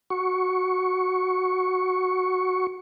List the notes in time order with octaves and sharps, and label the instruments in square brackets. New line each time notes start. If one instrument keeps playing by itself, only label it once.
[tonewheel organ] F#4 C#6